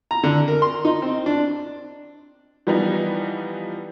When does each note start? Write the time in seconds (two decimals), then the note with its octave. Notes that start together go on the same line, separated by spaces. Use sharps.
0.11 A#5
0.23 D3
0.48 A#4
0.62 C6
0.85 D#4
1.02 C4
1.26 D4
2.67 E3 F3 G3 B3 D#4